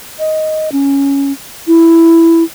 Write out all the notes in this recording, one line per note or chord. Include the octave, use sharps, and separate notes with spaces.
D#5
C#4
E4